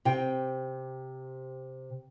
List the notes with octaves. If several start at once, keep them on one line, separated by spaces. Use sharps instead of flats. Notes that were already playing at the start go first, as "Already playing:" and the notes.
C3 G5